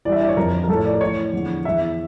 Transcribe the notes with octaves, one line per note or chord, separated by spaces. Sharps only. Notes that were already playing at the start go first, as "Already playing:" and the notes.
G2 E3 D5
E5
D5
C#5
F2 D3 F3 A#4
A#4
A2 F3 A4 C#5
D5
A#4
A2 E3 C#5
E2 D3 F3
E2 E3 E5